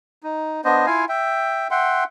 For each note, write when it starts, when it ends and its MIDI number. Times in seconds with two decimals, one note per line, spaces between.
0.23 0.61 63
0.65 0.86 59
0.65 0.86 62
0.65 0.86 72
0.65 0.86 75
0.86 1.05 64
0.86 1.05 65
0.86 1.05 77
0.86 1.05 80
1.09 1.68 76
1.09 1.68 79
1.71 2.04 76
1.71 2.04 78
1.71 2.04 79
1.71 2.04 84